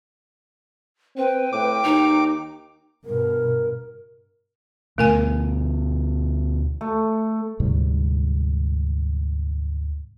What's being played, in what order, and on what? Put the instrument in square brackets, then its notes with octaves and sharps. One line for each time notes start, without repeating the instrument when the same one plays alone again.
[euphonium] C4 [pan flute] B4 [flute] G5
[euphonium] A2 [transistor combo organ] D6
[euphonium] D#2 [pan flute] D#4
[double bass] G2 B2 [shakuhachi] A#4
[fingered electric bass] D2 B2 [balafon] A3 A#4 G#5
[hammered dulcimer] A3
[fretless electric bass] D2 G#2 C3 G3